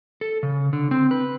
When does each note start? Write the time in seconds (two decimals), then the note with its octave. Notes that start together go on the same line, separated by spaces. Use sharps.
0.21 A4
0.43 C#3
0.73 D3
0.91 C4
1.11 B4